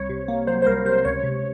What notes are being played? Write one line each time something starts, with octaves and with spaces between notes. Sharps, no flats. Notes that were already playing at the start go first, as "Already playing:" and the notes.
Already playing: C2 C#5
C3
A#3
F#3 C5
C5
C2 A#4
C3 C5
C#2 C#5
C3